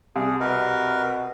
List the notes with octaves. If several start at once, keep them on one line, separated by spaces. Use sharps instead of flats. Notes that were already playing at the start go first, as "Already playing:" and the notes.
C2 G#4
B2 A#4 B4